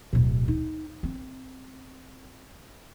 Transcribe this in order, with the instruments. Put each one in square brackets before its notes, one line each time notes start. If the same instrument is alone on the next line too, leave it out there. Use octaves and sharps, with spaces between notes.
[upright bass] D1 B2
D#4
C4